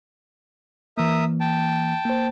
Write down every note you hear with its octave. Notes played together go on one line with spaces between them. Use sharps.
E3 A#3 A#4 E5 D#6
G5 A5
A#3 C5